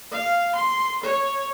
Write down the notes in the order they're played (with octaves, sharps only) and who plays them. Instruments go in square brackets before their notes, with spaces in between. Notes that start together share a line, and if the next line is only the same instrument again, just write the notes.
[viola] F5
C6
C#5